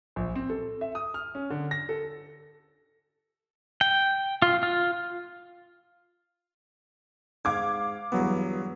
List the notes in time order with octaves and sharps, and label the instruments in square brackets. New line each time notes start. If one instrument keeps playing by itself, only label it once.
[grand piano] A#1
C4
A4
E5
D#6
F6
C#4
D3
A#6
A4
[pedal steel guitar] G5
F4
F4
[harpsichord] G#2 [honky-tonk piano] F5 D6 G#6
[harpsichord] E2 G2 [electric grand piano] F#3 B3